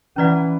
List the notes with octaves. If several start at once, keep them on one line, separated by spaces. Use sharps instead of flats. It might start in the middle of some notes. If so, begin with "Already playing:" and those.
E3 C#4 E4 B4 D5 F#5